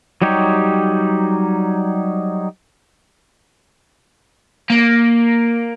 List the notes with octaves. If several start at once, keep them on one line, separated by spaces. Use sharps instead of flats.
F#3 G3 D#4 G4 C#5
A#3